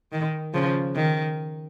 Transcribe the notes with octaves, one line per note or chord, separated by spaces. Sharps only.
D#3
C#3 F3
D#3